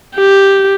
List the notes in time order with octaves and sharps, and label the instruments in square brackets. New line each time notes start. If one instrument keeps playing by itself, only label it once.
[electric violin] G4